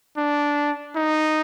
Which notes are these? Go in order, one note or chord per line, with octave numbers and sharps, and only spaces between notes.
D4
D#4